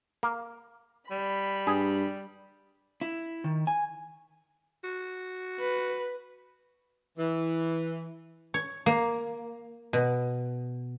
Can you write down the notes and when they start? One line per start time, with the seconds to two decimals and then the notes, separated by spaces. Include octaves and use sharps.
0.23 A#3
1.11 G3 B5
1.67 G2 G#4
3.01 E4
3.44 D#3
3.67 G#5
4.84 F#4
5.60 B4
7.18 E3
8.54 C#5
8.86 A#3
9.93 B2